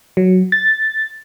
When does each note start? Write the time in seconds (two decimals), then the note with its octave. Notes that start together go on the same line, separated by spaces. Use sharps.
0.17 F#3
0.52 A6